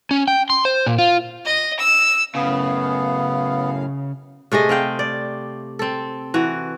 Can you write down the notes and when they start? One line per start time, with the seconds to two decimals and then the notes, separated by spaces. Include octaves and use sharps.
0.11 C#4
0.28 G5
0.50 C6
0.65 C5
0.86 A#2
0.98 F4
1.45 D#5
1.79 E6
2.35 F#2 A2 C#3 B3 F5
4.52 C3 A3 G#4 D#5
4.69 C4 F5 G5
4.99 D5
5.79 C4 A4
6.34 E3 F#4